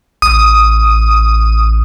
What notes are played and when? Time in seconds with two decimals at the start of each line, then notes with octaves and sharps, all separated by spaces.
0.22 A1 D#6